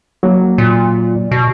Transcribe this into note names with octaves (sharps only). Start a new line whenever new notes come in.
F#3 A#3
A#2
B2